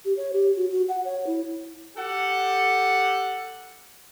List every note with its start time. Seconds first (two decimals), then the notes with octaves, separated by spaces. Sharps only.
0.05 G4
0.17 C#5
0.33 G4
0.57 F#4
0.71 F#4
0.89 F#5
1.05 C#5
1.27 E4
1.97 G4 A4 F#5